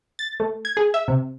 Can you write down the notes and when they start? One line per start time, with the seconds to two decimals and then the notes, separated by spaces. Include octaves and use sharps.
0.19 A6
0.40 A3
0.65 G#6
0.77 G#4
0.94 E5
1.08 C3